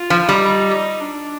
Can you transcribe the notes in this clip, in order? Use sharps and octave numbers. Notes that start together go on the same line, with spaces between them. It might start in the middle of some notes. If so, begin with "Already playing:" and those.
Already playing: F4
F3
G3 D#4
D4